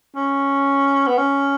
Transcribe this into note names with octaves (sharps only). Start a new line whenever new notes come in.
C#4
B3
C#4